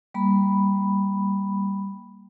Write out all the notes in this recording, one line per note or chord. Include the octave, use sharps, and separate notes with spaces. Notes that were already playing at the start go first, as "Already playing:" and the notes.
G3 A#3 B5